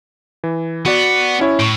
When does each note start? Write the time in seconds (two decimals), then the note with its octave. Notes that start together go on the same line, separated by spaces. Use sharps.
0.44 E3
0.86 B3 F#4 D5 F#5
1.40 C#4 E4 C#5
1.60 A2 C#6 D7